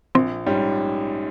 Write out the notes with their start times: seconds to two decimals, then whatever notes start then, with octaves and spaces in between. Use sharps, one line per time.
0.15 A#1 C4
0.46 G#2 G3 C#4